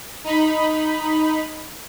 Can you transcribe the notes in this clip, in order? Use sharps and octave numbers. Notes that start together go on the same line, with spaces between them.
D#4 B5